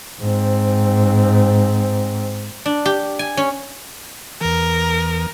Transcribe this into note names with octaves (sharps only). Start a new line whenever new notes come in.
G#2 C4
D4
G4
G#5
C#4
E2 E3 A#4